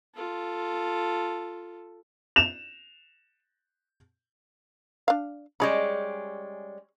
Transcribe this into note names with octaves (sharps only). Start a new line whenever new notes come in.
F4 A4
E7 F7
D4 F5
G3 G#3 C#4 G#4 B5